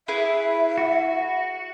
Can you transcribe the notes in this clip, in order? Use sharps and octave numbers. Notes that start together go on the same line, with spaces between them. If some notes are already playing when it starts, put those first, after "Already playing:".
E4 G#4 B4 E5
F#4